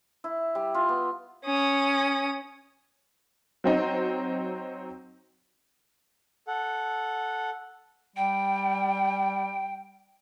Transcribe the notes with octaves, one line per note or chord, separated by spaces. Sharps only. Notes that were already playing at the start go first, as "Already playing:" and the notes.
E4
G3
F4
B3
C#4 D#6
F#3 C4 D#4
A4 F#5
G3 G5